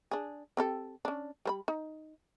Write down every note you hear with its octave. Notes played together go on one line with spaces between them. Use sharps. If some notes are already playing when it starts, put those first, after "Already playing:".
D4 G#4
C4 G4 A4
C#4 D4
G3 C5 B5
D#4